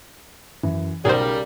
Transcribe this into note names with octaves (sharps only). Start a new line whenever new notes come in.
F#2 E3
B1 C#3 G3 G#4 A#4 C5